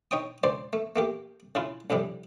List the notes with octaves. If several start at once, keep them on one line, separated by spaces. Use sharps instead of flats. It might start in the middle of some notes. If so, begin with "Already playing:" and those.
D#4 C#5 G5 D#6
C#2 C5 D5
A3
A3 A#3 G4
C#3 E4 F4
C2 F2 A2 C3 G3